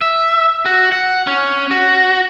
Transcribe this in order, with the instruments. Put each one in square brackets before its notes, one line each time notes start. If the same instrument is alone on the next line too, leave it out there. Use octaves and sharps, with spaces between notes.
[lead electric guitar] E5
F#4
F#5
C#4
F#4